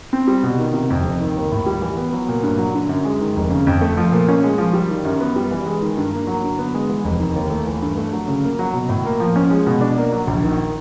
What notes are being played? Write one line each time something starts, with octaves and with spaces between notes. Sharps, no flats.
C4
G3
B2
D#3
C3
F2
F1
D#3
D#2
A2
G3
E3
B3
F#3
A#2
G2
F#3
D3
F#2
G#3
D#3
F1
C#3
F2
A3
F3
A#2
C#4
G#3
F3
G3
D#3
F#2
B3
G3
E3
G#3
D#3
G2
A#3
F#3
D3
B3
G#3
E3
F1
D#3
D#2
A3
E3
G2
A3
F#3
C#3
A#3
F#3
B2
A2
A#3
F3
C#4
G#3
B2
D4
A#3
F#3
A#1
D#3